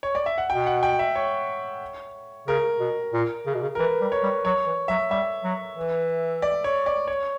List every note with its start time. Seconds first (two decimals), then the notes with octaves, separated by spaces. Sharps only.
0.03 C#5
0.15 D5
0.26 E5
0.38 F#5
0.50 B2 G5
0.66 F#5
0.83 G5
0.99 E5
1.15 C#5
2.48 C#3 A#4
2.80 B2
3.13 A#2
3.46 C#3
3.54 B2
3.62 C#3
3.75 A#4
3.79 E3 B4
4.01 G3
4.12 C#5
4.23 G3
4.45 F#3 C#5
4.66 E3
4.88 F#3 E5
5.10 G3 E5
5.44 F#3
5.77 E3
6.42 D5
6.64 C#5
6.86 D5
7.08 C#5